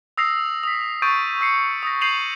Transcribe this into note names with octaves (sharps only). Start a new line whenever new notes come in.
D#6 E6 A#6 C7 F7
D#6 B6
C#6 D#6 G6 A6 D7 D#7
E6 C7 C#7
D#6 A#6
G6 C7 D#7 F7 F#7